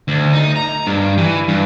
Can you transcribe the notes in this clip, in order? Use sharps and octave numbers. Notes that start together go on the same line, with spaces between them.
D2
D#4
A#5
G2
E3
G2